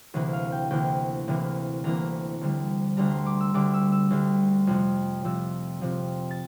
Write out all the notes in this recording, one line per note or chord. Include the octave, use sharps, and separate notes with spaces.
D2 C3 E3 A#3
F5
G5
D2 C3 E3 A#3 G5
D2 C3 E3 A#3
D2 C3 E3 A#3 A#5
D2 D3 G3
D2 D3 G3 A#5
C6
D6
E6
D2 D3 G3 D6
E6
E6
D2 D3 G3
F2 C3 F3
F2 C3 F3 E6
F2 C3 F3
A6